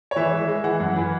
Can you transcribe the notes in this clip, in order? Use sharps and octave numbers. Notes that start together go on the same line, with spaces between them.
C#5
E3 E5
G#3
G#3
E3 F#5
F#2
E3